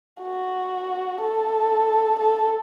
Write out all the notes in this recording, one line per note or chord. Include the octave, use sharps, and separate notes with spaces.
F#4
A4
A4